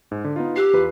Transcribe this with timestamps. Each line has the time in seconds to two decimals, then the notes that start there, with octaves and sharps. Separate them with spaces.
0.11 G#2
0.24 D3
0.36 B3 D#4 F4
0.56 G4 E6 F#6 C7
0.73 E2 F4 B4